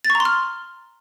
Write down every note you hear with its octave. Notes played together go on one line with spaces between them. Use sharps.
A6
C#6
A#5
C6
F6